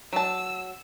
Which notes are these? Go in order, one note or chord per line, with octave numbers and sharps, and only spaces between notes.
F#3 A5 E6